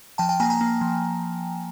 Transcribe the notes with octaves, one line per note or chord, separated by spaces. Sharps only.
F3 G5 A5
G5 A5
A#3 G#5 A#5
G#5 A#5
A#3
F3